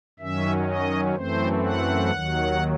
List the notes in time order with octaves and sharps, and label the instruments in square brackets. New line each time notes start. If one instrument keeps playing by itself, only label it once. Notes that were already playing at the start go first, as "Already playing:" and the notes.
[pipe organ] F#2 D#3 F#3 C#4 E5
D#5
F#2 E3 A3 C4 C5
F#5
D#2 D#3 F#3